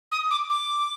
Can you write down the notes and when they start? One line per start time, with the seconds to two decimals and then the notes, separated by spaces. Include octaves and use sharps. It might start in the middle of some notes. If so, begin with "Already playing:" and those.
0.12 D#6
0.31 D6
0.50 D6